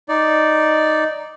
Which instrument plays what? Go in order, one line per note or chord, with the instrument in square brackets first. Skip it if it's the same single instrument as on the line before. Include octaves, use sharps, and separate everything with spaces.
[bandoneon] D#4 D5